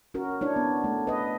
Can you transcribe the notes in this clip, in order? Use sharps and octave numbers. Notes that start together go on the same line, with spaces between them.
C#4 F#4 A#4
D4 E4 C#5
B3
A3
B4 D#5